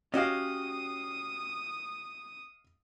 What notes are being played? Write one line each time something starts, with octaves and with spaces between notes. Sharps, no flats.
C#4 F#4 G4 D#5 F5 D#6